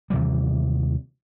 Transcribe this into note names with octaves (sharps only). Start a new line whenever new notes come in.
D#2 C3 E3 G3